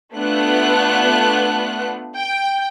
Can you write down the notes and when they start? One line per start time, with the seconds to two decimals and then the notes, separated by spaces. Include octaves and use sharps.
0.15 A3 B3 D4 F4 F#6
2.16 G5